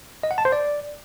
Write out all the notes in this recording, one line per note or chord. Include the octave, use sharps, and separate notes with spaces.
D#5
F#5
A5
C5
D5